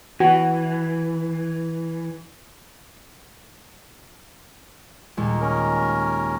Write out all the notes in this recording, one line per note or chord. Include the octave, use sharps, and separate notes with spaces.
E3 F#4
D#2 A#2 G#3
C#4 A#4